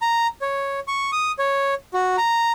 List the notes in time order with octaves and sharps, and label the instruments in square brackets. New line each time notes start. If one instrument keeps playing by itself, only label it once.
[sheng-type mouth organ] A#5
C#5
C#6
D#6
C#5
F#4
A#5